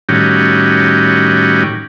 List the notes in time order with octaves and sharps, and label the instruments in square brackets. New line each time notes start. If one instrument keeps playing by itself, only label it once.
[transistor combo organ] A2 D#3 G3 C#4 F#4 G4